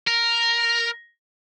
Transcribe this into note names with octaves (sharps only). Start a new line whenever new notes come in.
A#4